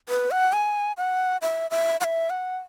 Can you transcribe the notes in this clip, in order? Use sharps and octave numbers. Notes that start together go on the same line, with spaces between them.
B4
F#5
G#5
F#5
E5
E5
F#5
E5
F#5